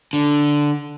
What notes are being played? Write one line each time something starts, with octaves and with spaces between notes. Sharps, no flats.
D3